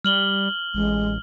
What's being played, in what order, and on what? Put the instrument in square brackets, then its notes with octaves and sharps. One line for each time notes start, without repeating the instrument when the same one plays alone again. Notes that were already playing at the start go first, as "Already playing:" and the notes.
[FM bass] G3 [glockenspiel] F6 F#7 G7
[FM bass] A1 [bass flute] G#3